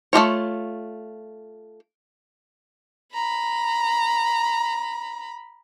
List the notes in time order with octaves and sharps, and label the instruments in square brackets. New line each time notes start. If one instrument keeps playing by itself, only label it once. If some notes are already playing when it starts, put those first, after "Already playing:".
[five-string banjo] A3 A#3 F4 C#5
[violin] A#5 B5